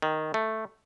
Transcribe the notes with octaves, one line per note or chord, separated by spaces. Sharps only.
D#3
A3